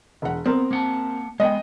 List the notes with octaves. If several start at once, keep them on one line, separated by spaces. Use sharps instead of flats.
E1 F#5
B3 C4 A#4
A#3 F#5 A5
G#3 B3 D#5 G5